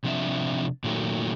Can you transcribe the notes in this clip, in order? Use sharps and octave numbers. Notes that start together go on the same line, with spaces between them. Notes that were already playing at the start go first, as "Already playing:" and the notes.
C3 F3 C4 D4 C5 E5
A#2 D#3 F#3 A3